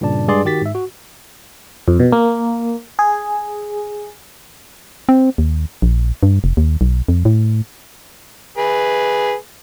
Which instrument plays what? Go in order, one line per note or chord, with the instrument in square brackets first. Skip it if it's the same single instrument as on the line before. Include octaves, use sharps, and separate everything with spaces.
[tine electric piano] G2 A#2 C#3 D5 A5
G2 G#3 G#4 D5 C6
D#3 F#4 G4 A6 B6
G#2 E5
F#4
[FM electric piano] F2
B2
A#3
G#4
[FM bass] C4
D#2
A#1
G2
F1
D#2
B1
F2
A2
[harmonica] G#4 B4